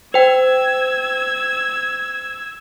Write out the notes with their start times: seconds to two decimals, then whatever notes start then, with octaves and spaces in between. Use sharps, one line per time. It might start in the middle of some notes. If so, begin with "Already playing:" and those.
0.14 C5 G5 E6 G#6